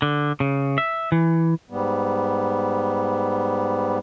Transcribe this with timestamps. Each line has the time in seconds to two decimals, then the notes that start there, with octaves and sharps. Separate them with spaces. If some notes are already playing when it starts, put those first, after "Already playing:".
0.02 D3
0.40 C#3
0.78 E5
1.12 E3
1.70 G#2 G3 B3